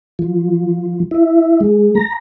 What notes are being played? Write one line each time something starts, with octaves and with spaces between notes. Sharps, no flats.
F3
E4
G#3
A#5